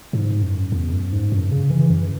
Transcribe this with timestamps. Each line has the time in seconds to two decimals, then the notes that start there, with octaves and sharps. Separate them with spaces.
0.13 G#2
0.42 F#2
0.72 E2
0.92 F#2
1.12 G#2
1.32 F#2
1.52 C#3
1.70 E3
1.90 F#2